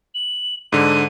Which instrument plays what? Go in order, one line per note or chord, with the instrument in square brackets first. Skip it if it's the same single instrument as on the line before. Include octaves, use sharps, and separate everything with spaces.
[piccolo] F#7
[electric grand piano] G#2 D3 [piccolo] D#7